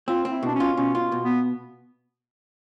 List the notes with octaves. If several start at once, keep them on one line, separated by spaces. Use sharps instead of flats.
C4 F4
C4
E4
B2 D4
C#4
F4
B2 C#4
F4
B2
B3